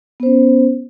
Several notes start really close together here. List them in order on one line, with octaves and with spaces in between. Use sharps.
B3 C5 C#4